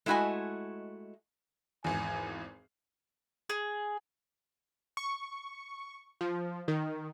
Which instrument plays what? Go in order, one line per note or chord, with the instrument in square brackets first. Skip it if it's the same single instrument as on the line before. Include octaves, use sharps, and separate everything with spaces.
[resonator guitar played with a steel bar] G#3 A3 E4 F#4 D#5 G#5
[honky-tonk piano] G#1 E2 [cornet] G#5
[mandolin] G#4
[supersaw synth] C#6
F3
D#3